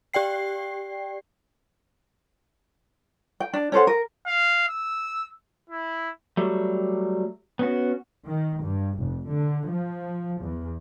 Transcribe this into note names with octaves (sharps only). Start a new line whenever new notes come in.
G4 D5 G5 C7
G5
D4
C#4 A4 C5 F#5
A#4
F5
E6
E4
F#3 G3 A3
B3 C#4 F#4
D#3
G2
F1
D3
F3
E2